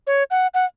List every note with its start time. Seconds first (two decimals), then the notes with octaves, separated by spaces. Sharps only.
0.07 C#5
0.31 F#5
0.54 F#5